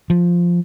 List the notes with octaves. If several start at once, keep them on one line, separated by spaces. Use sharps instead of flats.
F3